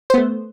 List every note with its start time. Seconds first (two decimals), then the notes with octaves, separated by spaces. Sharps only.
0.10 C5
0.14 B3
0.18 A3